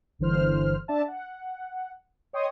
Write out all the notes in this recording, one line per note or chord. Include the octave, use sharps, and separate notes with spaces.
G1 D3 E3 C5 F6
D4 D5 E5 A5
F#5
C#5 D#5 G5 C6 C#6 D#6